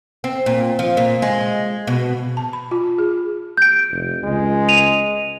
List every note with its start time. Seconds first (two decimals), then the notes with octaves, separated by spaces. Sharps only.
0.24 C4
0.46 A#2
0.79 F3
0.97 A#2
1.22 G#3
1.87 B2
2.37 A5
2.53 B5
2.71 F4
2.98 G#4
3.57 G6 D7
3.91 F1
4.24 C#2 G#3
4.69 D#7 F7